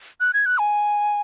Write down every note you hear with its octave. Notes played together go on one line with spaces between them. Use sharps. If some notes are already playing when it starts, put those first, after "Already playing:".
F#6
G#6
F#6
G#5